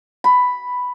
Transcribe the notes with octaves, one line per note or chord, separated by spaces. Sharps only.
B5